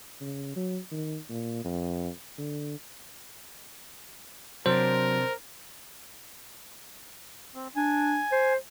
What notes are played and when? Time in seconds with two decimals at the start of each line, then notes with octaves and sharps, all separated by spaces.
0.21 C#3
0.56 F#3
0.91 D#3
1.29 A#2
1.65 F2
2.38 D3
4.66 C3 F#3 D4 A#4 C5
7.55 C4
7.76 D4 G#5
8.32 C5